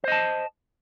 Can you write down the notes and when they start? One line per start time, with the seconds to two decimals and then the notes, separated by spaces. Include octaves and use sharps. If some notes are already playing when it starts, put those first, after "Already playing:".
0.04 C5
0.08 D#5
0.12 A5